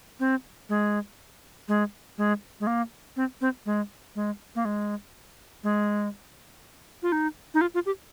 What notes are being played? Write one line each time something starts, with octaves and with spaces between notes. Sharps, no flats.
C4
G#3
G#3
G#3
G#3
A#3
C4
C4
G#3
G#3
A#3
G#3
G#3
F4
D#4
D#4
F4
F4
G4